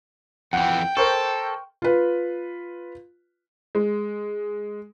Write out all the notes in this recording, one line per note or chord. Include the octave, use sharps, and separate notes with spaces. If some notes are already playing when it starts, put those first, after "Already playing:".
F2 E3 F#5 G5
A4 A#4 C5 C#6
F4 B4
G#3